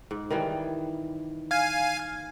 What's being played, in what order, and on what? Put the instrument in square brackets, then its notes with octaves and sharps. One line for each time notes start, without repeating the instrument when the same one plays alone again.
[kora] G#2
D#3 E3 G3
[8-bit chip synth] F5 G#5